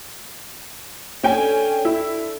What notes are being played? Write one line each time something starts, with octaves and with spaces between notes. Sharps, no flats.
C#4 D4 A4 G5 G#5
E4